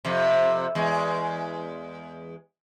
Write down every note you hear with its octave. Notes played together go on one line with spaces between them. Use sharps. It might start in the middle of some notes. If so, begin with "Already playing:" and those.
F2 C3
E2 G#3